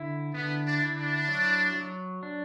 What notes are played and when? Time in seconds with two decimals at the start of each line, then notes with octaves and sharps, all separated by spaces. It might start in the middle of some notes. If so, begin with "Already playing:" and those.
Already playing: D3 E4
0.34 D3 B3
0.66 D4
0.82 E4
0.97 D4
1.28 F#3
1.75 F#3
2.23 D4